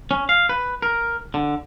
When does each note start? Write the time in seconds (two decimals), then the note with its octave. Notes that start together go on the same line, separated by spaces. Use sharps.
0.11 C#4
0.29 F5
0.49 B4
0.82 A#4
1.34 D3